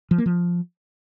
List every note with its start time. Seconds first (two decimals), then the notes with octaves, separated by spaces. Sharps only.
0.11 F3
0.18 A#3
0.26 F3